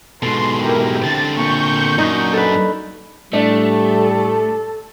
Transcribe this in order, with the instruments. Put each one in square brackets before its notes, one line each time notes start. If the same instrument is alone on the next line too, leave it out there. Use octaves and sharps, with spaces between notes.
[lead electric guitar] G#2 B2 [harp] A4 [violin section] C6
[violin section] E4 G4 A#4
[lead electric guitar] D3 C4 [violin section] A6
[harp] A#2 [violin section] C#6 G6
[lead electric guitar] F#2 [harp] D4 D#4
[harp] A4 B4
[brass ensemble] A2 G3 [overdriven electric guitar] A3 [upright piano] D4 [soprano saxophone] A4